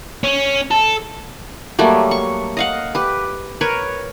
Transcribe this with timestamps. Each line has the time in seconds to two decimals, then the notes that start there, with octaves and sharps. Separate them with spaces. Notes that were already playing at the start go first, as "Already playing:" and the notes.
0.24 C#4
0.71 A4
1.79 F#3 G3 A3 A#3
2.11 C#6
2.57 D#5 F5 F#5
2.95 G4 B4
3.61 A#4 B4 C#5